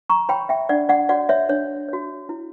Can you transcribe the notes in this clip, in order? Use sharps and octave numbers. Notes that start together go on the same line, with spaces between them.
A#5 C#6
C#5 G5 B5
E5 G5
D4 D5 F#5
D5 F#5
F#4 C#5 D5 F#5
C#5 E5
D4 C#5
F#4 C#5
E4